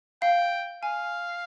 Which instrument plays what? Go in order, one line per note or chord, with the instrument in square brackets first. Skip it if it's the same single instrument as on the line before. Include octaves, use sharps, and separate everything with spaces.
[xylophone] F5 [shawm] G5
[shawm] F5 [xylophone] G#5